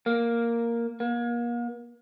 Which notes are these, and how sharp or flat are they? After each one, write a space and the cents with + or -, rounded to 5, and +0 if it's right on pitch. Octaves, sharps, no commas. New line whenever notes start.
A#3 +0
A#3 +35